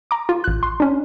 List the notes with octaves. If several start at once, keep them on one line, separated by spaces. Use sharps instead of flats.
A#5 D6
F4
A1 F#6
C6
C#4 D4